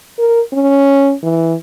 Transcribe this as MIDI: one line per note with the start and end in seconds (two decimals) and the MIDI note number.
0.19 0.41 70
0.53 1.14 61
1.23 1.55 52